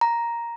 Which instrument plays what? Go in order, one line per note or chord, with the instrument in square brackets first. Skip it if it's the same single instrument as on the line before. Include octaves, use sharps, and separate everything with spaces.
[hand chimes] A#5